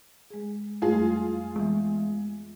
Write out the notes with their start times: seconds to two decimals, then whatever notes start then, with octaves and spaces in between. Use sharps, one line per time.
0.30 G#3 G#4
0.82 F2 G3 A3 F4 G#4
1.56 E3 G#3 B3